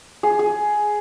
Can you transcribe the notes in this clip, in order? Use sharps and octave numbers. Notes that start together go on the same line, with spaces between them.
G#4
G#4